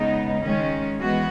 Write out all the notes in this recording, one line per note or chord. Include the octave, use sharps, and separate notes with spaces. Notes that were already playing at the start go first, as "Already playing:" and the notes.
Already playing: C#3 G#3 B3 D#4
D#3 G#3 C#4
E3 G#3 B3 F#4